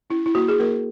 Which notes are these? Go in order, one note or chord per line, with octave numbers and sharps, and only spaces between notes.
C#4 E4
E4
A#3 F#4
G#4
A#3 A#4